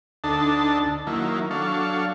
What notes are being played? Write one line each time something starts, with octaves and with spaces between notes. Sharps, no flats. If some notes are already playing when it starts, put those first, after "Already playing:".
D2 D4 D#4 A4 A5
D#3 F#3 A#3 E4
F#3 D4 A4 F5 C#6